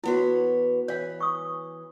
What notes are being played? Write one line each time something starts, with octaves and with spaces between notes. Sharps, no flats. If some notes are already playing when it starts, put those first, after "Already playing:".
E2 B3 E4 F#4 C#5
E3 C#5 F5
C#6 D#6